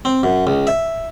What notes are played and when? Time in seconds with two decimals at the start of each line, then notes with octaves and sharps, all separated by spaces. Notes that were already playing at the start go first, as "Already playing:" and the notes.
0.05 C4
0.23 F#2
0.47 C#2
0.67 E5